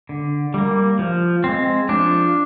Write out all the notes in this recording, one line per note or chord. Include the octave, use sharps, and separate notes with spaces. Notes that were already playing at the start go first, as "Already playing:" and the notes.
D3
G3 A#3
F3
G#3 C4
F3 D4